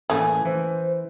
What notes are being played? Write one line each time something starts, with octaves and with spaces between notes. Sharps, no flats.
A2 C#3 E3 A3 A#3 G#5
E3 C5